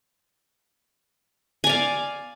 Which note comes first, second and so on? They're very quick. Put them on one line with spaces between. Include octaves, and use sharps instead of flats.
G#5 D5 F5